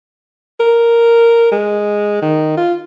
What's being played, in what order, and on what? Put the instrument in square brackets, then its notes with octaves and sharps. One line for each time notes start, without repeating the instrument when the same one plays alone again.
[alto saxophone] A#4
G#3
D#3
F4